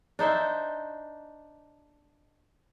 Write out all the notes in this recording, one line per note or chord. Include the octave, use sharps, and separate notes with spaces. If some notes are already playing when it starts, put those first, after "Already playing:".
D4 D#4 C5 E5